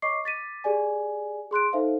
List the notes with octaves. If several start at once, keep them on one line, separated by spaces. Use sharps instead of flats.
C#5 D#5 C#6 D6 C7
D6 A6 B6 D#7
G4 G#4 D5 G#5
G#4 C6 F#6 D7
D#4 A4 C5 E5 F5